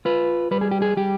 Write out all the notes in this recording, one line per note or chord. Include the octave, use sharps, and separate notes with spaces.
F4 B4
G3 B4
G#4
G4
G#4
G3 G4